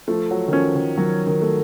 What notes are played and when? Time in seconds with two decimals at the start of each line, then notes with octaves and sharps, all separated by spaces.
0.08 F3 A3
0.31 F#3
0.48 D#3
0.52 F3 C#4
0.75 D#3
0.97 D#3 F#3
1.27 D#3
1.42 A3